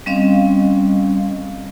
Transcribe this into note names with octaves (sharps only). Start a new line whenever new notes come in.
G3 C4 C#4 D#5 F5 C#6